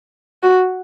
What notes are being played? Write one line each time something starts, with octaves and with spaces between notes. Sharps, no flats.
F#4